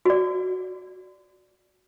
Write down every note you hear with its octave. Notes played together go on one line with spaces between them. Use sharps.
F#4 D5